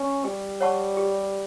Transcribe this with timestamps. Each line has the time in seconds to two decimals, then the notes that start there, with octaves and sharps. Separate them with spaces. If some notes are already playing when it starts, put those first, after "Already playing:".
Already playing: C#4
0.24 G3 G4
0.61 C#5 F#5 A5 C#6
0.97 G4